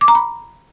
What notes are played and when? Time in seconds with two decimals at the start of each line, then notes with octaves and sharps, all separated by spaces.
0.01 D6
0.08 A#5
0.15 B5